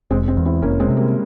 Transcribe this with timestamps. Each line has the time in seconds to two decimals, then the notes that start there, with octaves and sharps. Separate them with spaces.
0.11 F1 G#3 C4
0.28 G#3 C4
0.37 E2
0.45 C4 E4
0.62 F1 A#3 C#4
0.80 G#3 C4
0.88 C3
0.97 G3 A#3